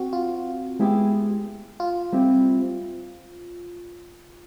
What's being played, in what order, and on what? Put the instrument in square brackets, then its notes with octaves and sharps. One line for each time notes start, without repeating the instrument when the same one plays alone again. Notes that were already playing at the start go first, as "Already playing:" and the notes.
Already playing: [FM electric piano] C4 F#4
F4
[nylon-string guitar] G#3 B3 E4 G4
[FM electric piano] F4
[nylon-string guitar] G3 C4 E4